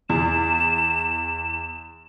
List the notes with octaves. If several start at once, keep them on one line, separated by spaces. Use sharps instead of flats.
E2 E7